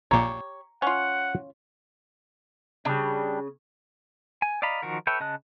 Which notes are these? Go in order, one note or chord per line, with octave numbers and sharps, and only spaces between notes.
A#1 A#2 G4 C#5 A#5
C#4 F4 F#5
C#3 G3 D4
G#5
D5 D#5 F5 A#5 B5
D#3 F3 F#4 A#4
A4 B4 C#5 E5 G5
C#3 D#5 A5 F#6